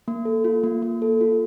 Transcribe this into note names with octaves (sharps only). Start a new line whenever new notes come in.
A#3
A4
F4
A#3
A#3
A4
F4